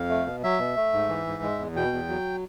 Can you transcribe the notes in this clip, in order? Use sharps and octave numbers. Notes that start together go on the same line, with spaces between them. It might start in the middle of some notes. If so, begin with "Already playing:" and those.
Already playing: F2 F5
A3
B2
F#3 E5
B2
A3
G#2
E3
G#2
G#3
E2
B2 G5
E2
F#3